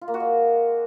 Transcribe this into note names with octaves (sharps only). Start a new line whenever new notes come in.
F4
A#3
F#4
G#3